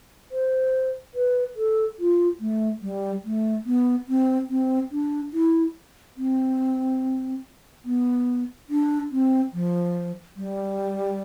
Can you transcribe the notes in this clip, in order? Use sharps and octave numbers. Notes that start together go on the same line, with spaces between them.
C5
B4
A4
F4
A3
G3
A3
B3
C4
C4
D4
E4
C4
B3
D4
C4
F3
G3